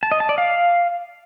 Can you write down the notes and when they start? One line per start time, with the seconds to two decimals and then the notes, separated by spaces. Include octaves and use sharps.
0.03 A5
0.12 D#5
0.20 A5
0.29 D5
0.38 F5